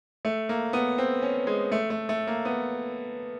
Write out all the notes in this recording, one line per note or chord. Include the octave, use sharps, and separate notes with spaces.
A3
A#3
B3
C4
C#4
G#3
A3
A3
A3
A#3
B3